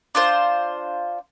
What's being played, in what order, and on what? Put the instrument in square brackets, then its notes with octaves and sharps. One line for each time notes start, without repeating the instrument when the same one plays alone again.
[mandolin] D4 F4 C5